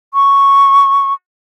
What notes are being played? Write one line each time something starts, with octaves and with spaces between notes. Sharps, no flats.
C#6